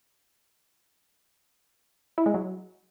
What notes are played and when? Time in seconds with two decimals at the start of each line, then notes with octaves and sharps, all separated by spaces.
2.18 E4
2.26 G#3
2.34 F#3